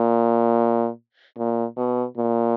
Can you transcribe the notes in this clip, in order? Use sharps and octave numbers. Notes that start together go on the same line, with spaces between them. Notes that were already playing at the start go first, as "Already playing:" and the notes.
Already playing: A#2
A#2
B2
A#2